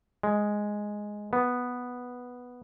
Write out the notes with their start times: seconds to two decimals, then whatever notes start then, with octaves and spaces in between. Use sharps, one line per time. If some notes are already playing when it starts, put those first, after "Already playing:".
0.23 G#3
1.33 B3